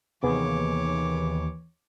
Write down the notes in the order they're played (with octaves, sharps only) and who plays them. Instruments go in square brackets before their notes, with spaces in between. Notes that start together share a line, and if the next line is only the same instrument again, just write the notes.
[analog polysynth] D#2 [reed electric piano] C3 B3 G#4 [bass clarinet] E3 [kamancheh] C#5 D6